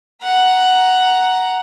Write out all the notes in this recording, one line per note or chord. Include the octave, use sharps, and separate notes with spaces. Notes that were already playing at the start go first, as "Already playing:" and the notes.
F#5 A#5